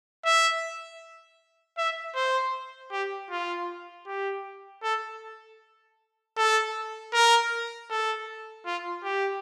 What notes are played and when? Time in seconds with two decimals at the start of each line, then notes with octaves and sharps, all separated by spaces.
0.25 E5
1.78 E5
2.15 C5
2.91 G4
3.31 F4
4.07 G4
4.83 A4
6.37 A4
7.13 A#4
7.90 A4
8.66 F4
9.04 G4